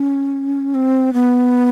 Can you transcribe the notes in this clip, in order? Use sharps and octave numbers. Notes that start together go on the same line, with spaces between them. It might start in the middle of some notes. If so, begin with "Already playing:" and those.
Already playing: C#4
C4
B3